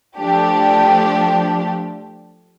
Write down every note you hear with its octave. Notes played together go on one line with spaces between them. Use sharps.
F3 A3 D4 G4